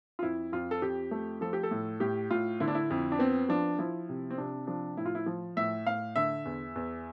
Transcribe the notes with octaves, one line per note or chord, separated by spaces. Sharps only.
F4
F2 E4
F2 F4
A4
F2 G4
A3
F3 A4
G4
A4
A2
A2 G4
A2 F4
D3 E4
D4
E4
F2
D4
B3 C4
F3 D4
F3 E4
C3
C4
C3 D4
F3 D4
A2 E4
F4
E4
F3
A2 E5
A2 F5
D3 E5
E2
E2